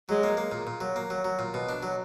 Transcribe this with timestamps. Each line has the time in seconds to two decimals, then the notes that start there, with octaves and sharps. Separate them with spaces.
0.09 F#3 G#3
0.23 A#3
0.37 A#3
0.52 A#2
0.67 A#2
0.81 F#3
0.96 A#3
1.10 F#3
1.24 F#3
1.39 A#2
1.54 B2
1.69 D4
1.83 F#3